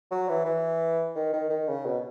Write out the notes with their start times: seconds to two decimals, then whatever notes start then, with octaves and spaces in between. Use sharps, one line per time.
0.11 F#3
0.29 E3
0.45 E3
1.16 D#3
1.33 D#3
1.50 D#3
1.68 C#3
1.86 B2